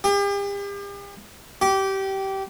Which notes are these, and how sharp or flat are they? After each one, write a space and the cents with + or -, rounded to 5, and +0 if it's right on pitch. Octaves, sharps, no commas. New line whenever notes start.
G4 +40
G4 -20